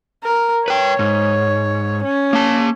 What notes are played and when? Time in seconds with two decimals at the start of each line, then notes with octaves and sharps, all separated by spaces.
0.24 A#4
0.68 B4 C#5 G5
0.99 G#2
2.04 C#4
2.33 A#3 A5